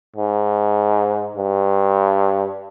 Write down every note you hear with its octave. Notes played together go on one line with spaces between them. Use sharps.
G#2
G2